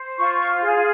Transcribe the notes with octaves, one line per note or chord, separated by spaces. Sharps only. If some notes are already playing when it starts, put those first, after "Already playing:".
Already playing: C5
F4 C#6
G#4